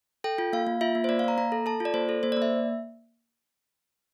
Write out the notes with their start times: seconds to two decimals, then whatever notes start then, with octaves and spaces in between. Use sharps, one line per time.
0.24 A4 G5
0.38 F4
0.53 A#3 F5
0.67 A#3
0.81 F4 E5
0.95 A#3
1.04 C5
1.09 A#3 D5
1.19 F5
1.24 A#3 A#5
1.38 A#3 A#5
1.52 A4
1.66 A4 A5
1.80 F4
1.85 D5
1.94 A#3 C5
2.09 A4
2.23 A#3 C5
2.32 D5
2.37 A#3
2.42 E5